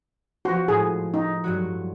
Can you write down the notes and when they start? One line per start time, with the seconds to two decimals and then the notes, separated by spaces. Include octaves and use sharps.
0.45 F3 F#4 C5
0.68 A2 G#3 G#4
1.14 D#4
1.44 G2 F#3 F#4